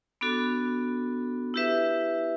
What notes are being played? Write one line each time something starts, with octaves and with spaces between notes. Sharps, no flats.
B3 D4 F#4 A4
E4 G4 B4 E5